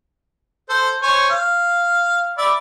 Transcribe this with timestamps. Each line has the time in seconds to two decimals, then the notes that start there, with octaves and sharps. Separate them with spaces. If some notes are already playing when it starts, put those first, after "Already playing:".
0.69 A4 C5
1.02 C5 C#5 G#5
1.30 F5
2.38 D5 E5 B5